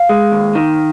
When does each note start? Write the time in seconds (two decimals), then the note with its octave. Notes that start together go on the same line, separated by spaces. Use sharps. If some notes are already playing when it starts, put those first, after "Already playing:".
Already playing: F5
0.09 G#3
0.32 D#2
0.55 D#3